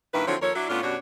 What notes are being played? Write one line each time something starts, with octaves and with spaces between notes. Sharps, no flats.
G2 D#3 A#3 E4 B4
D3 F3 F#3 C4 E4 C#5
D#2 F3 A4 A#4 C#5
F#3 D4 E4
A2 B3 C#4 D4 F4
F#2 B2 G3 D4 F#4 C#5